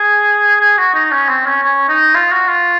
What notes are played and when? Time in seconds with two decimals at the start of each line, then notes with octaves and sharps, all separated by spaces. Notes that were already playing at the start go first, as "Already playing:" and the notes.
Already playing: G#4
0.60 G#4
0.77 F#4
0.94 D#4
1.12 C#4
1.29 C4
1.46 C#4
1.63 C#4
1.89 D#4
2.14 F4
2.31 F#4
2.48 F4